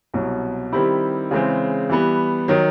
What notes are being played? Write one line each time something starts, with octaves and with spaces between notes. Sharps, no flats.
C2 B2 F#3
D#3 G3 C4 E4 G4
C#3 E3 G#3 C4
E3 G3 B3
D#3 F#3